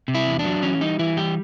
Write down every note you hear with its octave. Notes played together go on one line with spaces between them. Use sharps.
C3
E4
E2
D4
F#3
E3 C#4
G3 D#4
E3 E4
G3 G4